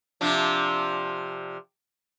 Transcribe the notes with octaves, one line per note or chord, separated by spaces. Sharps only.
C3 F3 D4